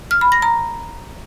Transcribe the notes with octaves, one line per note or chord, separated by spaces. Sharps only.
F6
B5
A#6
A#5